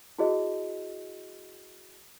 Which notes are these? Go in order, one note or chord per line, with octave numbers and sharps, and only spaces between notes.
E4 F#4 G#4 C#5 D#5